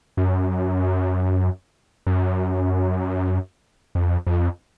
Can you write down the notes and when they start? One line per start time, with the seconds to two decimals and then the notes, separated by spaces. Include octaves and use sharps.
0.17 F#2
2.07 F#2
3.95 F2
4.27 F2